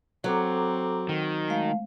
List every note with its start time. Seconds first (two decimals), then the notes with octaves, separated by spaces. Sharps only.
0.24 F#3 C4 A4 A#5 D6
1.09 D#3
1.48 G#3 A3 F5